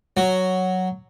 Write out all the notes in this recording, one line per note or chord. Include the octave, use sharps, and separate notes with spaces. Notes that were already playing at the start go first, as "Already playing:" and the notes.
F#3